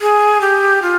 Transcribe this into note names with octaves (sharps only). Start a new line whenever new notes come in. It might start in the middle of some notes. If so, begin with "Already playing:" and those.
G#4
G4
F4